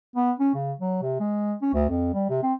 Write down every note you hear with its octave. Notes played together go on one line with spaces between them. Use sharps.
B3
C#4
C#3
F#3
C3
G#3
C#4
D2
F2
G3
C3
C4